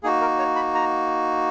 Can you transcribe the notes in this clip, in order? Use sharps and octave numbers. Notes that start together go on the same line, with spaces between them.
A#3 D#4 F#4 G#4
A#4
C#5
B5
A#5